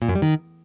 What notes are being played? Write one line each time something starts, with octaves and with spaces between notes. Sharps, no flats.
A#2
F#2
G3
D#3